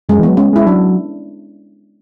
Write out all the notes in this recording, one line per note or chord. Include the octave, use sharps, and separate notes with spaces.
F#2 G#3
E3 B3
F#3
G#3 C#4
G#3 E4
F#3 D4